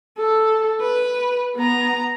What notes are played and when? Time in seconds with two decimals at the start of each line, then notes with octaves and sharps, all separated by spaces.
0.18 A4
0.81 B4
1.56 B3 A#5